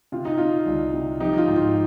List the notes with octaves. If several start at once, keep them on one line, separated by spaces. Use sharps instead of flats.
C3 F4
D#4
C3 F4
C2
C3
F3 D#4 G4
F4
G#2
F4